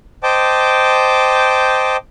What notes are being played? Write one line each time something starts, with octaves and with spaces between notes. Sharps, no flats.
C5 D#5 G5 A5 D6